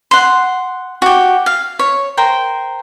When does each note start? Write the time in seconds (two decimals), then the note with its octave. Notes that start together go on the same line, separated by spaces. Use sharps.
0.11 F#5 C6
1.02 F#4 G4
1.46 F5
1.79 C#5
2.17 A#4 C5 G5